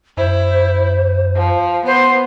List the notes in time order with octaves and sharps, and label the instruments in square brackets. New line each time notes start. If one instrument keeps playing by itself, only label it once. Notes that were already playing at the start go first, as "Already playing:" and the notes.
[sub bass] F#2 [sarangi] E4 [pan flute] C5
[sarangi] F3
[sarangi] B3 [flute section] C5